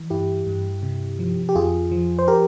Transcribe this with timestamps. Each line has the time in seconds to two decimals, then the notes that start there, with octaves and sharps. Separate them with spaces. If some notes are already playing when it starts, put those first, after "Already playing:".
Already playing: E3
0.10 G2 E4 G4
0.46 G2
0.83 C3
1.19 F3
1.49 G4
1.55 F2 F4 G#4
1.91 F3
2.19 C5
2.28 G4 A#4